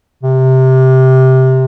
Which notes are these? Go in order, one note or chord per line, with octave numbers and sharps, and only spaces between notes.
C3